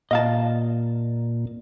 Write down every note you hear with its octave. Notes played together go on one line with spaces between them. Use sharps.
A#2 D#5 F5 A5